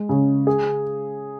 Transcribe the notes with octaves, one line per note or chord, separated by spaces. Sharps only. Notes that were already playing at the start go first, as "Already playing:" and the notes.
Already playing: G#3
C#3
G#4